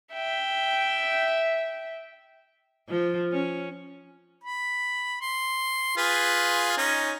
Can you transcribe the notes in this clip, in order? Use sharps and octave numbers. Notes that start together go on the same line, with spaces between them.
E5 G5
F3
C#4
B5
C6
F4 G#4 B4
C#4 D#4